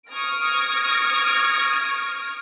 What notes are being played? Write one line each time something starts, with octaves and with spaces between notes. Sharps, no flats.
C#6 D#6 F6 G#6 A#6 D7